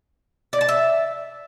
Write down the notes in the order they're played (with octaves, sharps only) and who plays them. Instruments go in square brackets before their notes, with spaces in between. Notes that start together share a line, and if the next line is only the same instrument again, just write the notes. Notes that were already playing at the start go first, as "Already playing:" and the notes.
[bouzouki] D5
A5
E5